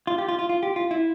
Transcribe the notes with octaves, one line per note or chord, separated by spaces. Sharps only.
F4
G4
F4
F4
F4
G4
F4
E4